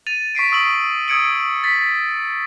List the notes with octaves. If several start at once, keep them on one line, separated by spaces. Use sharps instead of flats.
A6 D#7 F7
C#6 B6 C7 D7
C#6 D#6 E6 D7 F#7
D#6 E6 G#6 C#7 D7 F#7
A6 B6